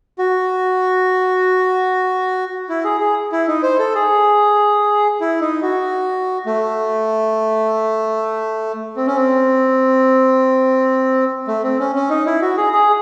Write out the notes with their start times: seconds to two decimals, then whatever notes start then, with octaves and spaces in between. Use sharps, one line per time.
0.19 F#4
2.69 E4
2.84 G#4
3.00 G#4
3.32 E4
3.48 D#4
3.63 C5
3.79 A4
3.95 G#4
5.21 E4
5.41 D#4
5.62 F#4
6.46 A3
8.97 C4
9.07 C#4
9.16 C4
11.48 A3
11.63 C4
11.79 C#4
11.95 C#4
12.10 D#4
12.26 E4
12.42 F#4
12.57 G#4
12.73 G#4